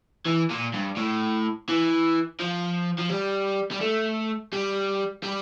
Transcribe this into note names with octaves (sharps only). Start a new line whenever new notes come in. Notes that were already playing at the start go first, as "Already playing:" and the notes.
E3
A#2
G2
A2
E3
F3
F3
G3
G3
A3
G3
G3